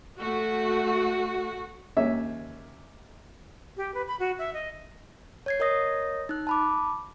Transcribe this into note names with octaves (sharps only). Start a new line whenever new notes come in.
A3 F#4
D#2 C#4 E5
G4
B4
B5
F#4
E5
D#5
C#5 G#6 C7
A#4 C#5 D#5 D#6 A#6
D#4 F#6
A5 B5 D6